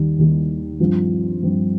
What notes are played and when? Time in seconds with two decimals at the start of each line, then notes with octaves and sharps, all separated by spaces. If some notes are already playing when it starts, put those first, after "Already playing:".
Already playing: D#2 D#3 G3
0.18 D#2 D#3 G3
0.80 G2 F3 C4
1.42 G2 F3 C4